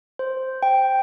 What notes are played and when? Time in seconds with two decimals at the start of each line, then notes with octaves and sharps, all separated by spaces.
0.19 C5
0.63 G5